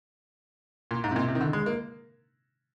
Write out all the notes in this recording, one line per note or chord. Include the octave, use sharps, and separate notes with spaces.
A#2
G#2
C3
A#2
C3
D#3
D3
G#3
A#3